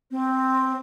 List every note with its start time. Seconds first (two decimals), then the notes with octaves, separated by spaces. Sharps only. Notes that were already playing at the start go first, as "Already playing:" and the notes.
0.11 C4